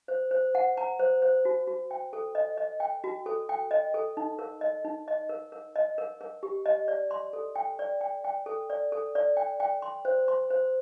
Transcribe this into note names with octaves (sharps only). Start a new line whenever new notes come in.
C5
C5
F#5
A#5
C5
C5
F#4
F#4
G5
A4
D#5
D#5
G5
F#4
A4
G5
D#5
A4
D#4
A#4
D#5
D#4
D#5
A#4
A#4
D#5
A#4
A#4
G4
D#5
D5
C6
A4
G5
D5
G5
G5
A4
D5
A4
D5
G5
G5
C6
C5
C6
C5